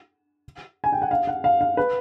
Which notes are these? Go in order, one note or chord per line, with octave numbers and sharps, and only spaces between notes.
G#5
G5
F#5
F5
F#5
F5
F5
B4